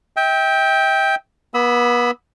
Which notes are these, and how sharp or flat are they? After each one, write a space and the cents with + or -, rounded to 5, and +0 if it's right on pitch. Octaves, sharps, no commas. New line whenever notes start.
E5 -40 G5 +5
B3 -35 B5 +5 E6 -35